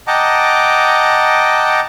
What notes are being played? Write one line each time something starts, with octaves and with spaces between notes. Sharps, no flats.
D#5 F#5 G5 A5 A#5 D6